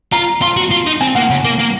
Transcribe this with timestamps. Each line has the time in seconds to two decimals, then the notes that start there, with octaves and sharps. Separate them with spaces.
0.12 F4 A#5
0.41 F4 C6
0.57 F#4
0.71 F4
0.86 D#4
1.01 C4 G#5
1.15 A#3 F#5
1.30 C#3
1.45 A#3
1.60 A#3